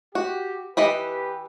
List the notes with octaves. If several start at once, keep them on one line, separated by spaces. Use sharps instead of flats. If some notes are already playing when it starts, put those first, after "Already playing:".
F#4 G4
E3 G4 B4 D#5 B5